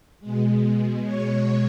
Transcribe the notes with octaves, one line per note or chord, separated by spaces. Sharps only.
B2 G#3
C#5